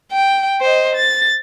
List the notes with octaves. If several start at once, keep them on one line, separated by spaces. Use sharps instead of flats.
G5
C5 D#5
A6